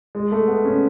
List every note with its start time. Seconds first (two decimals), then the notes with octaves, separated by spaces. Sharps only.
0.15 G#3
0.32 A3
0.48 B3
0.65 C#4